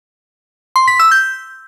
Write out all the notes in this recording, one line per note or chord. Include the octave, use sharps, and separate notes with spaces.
C6
B6
E6
G6